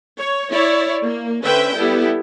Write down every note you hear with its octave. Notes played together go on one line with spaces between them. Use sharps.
C#5
E4 C#5 D5
A#3
D3 C#4 B4 C5 E5 G5
G3 B3 E4 G4 A4